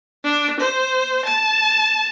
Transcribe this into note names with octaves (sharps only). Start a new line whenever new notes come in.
D4
C5
A5